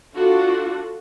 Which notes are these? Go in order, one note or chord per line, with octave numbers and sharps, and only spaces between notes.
D4 F4 F#4 A4